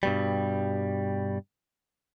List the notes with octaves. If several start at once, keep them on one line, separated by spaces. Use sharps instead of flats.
G2 B2 G3